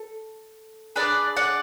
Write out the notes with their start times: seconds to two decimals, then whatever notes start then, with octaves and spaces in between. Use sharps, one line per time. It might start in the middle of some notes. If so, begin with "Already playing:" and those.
Already playing: A4
0.96 D4 G#4 B4 D5
1.36 D5 F#5